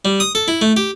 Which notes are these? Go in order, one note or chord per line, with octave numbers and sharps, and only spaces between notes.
G3
D#6
A4
E4
A3
G4